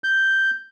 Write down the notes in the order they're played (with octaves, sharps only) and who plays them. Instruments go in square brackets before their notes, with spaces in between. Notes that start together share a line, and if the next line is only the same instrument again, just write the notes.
[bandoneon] G6